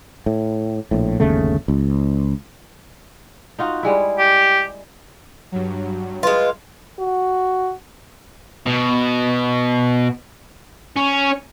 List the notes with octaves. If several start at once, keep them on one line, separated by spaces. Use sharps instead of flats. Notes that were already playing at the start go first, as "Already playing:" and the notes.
A2
A#1 A2
G1 D#2 C#3 A3
C#2
D#4 F4 F#4
G3 G#3 E4
G4
G2 F#3
G#3 F4 B4
F#4
B2
C#4